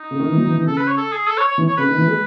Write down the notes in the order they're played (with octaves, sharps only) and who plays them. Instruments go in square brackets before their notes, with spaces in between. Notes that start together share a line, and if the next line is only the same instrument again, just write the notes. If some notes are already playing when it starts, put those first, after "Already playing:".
Already playing: [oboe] D#4
[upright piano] C#3
D#3
E3
F#3
E3
E3
[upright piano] C#3 [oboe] A4
[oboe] B4
C#5
A4
G#4
A4
C#5
C#5
[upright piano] E3
[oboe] C#5
[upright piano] C#3 [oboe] B4
[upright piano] D#3
E3
G#3